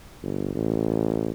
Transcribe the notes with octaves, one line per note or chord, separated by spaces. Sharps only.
G1
A1